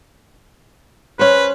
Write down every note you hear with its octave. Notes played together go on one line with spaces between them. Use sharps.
C#4 B4 C5